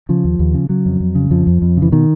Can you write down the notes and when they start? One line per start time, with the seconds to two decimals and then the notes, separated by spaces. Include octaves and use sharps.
0.09 C#3 F3
0.24 D#2
0.39 D#2
0.54 C#3
0.69 C#3 F#3
0.86 F2
1.00 F2
1.15 C#3
1.31 F2 F3
1.47 F2
1.62 F2
1.77 C#3
1.82 E3
1.92 B2 D#3